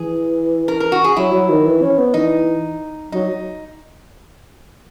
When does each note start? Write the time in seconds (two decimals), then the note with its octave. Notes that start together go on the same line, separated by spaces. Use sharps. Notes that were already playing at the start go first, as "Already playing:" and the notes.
Already playing: E3 G#4
0.68 A#4
0.80 A#4
0.92 F#4
1.04 G#4
1.16 F#3 E4
1.33 F#3
1.49 D#3
1.65 E3
1.82 C#4
1.98 B3
2.14 E3 D#4
3.12 F#3 D#4